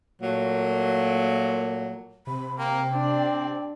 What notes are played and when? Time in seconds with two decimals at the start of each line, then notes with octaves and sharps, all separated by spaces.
0.22 A#2 F#3 A3 A#3
2.27 C3 B5
2.58 A#3 G5
2.91 C4 D4 D5